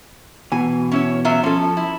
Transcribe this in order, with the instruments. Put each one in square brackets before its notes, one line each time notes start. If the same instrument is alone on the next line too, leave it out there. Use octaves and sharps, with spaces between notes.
[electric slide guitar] B2 E3 [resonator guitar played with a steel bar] G#5
[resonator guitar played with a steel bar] C#4 E4 C#5
F#3 F4 E5
[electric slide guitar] F3 [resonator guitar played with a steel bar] C#4 A4
[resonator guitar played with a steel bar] E4